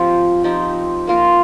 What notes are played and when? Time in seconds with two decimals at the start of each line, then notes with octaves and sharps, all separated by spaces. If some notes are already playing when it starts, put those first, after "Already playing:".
Already playing: F3 C4 G4
0.44 F3 C4 D#4 G4
1.07 A#3 F4 A#4